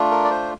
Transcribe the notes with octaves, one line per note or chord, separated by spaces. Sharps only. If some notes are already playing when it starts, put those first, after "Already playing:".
Already playing: A3 D4 F4
A#4
D5
C5